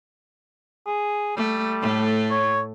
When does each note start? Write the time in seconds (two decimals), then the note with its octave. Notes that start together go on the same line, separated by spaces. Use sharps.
0.87 G#4
1.36 G3 A3
1.82 A2 A3
2.30 C#5